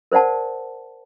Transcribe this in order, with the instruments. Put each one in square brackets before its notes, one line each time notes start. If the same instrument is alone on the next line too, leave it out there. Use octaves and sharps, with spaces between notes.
[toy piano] A#4 C5 D5 F#5 A5